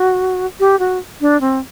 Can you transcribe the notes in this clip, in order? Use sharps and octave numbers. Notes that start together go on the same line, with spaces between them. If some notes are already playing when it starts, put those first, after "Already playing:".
Already playing: F#4
G4
F#4
D4
C4